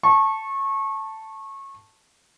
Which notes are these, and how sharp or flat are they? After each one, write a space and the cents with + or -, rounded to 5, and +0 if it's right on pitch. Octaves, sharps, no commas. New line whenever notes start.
A5 +0 C#6 -25